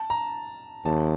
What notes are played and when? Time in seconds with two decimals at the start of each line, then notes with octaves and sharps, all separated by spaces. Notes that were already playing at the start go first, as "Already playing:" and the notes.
Already playing: A5
0.10 A#5
0.85 D#2 A5